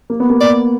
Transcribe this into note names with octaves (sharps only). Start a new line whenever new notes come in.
A#3
B3
A#3
D5